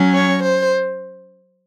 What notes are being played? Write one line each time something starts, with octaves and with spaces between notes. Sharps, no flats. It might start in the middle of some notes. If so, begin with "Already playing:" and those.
Already playing: F#3 C#4
C#5
C5